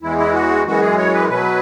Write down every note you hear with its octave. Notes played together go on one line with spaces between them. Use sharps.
E2 E3 G#3 E4
E4
F#4
F#2 E3 G#3 F#4
G#4
C#5
B4
B2 F#3 B4